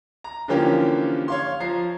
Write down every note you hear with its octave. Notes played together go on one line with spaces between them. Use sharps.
A#5
D3 E3 F3 A#3 C#4 G4
C#5 F5 C6
F3 A#5 C7